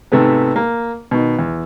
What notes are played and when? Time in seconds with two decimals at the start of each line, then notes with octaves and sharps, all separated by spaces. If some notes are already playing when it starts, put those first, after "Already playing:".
0.12 G#2 C3 A3 B3
0.56 A#3
1.11 B2 D#3
1.39 E2